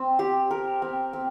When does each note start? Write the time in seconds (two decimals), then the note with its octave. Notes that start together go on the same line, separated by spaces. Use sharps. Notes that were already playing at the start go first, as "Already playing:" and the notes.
Already playing: C4
0.19 G4
0.51 A#4
0.82 C4
1.13 C4